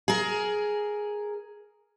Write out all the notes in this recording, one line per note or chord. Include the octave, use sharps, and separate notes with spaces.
G#4 A#4